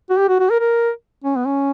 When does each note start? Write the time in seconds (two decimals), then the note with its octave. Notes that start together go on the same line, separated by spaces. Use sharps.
0.10 F#4
0.18 G4
0.28 F#4
0.39 F#4
0.50 A#4
0.60 A#4
1.24 C#4
1.36 B3
1.46 C#4